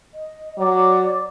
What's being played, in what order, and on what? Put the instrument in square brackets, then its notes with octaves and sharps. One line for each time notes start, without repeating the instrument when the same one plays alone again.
[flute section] D#5
[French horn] F#3 [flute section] C#5 D5 D6